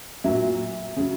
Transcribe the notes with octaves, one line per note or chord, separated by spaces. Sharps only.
A#2 F#3 E5
C#3 F#3